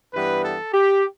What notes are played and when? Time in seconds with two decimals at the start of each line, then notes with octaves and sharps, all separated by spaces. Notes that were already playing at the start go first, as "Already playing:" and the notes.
0.13 G2 E3 G3 B3 B4
0.43 A4
0.73 G4